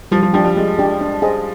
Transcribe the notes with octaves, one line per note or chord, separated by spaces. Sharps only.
F3 G3
F3
F3 D4 G4
G3
G3 G#3
D4 G4
D4
G#4 C5 D#5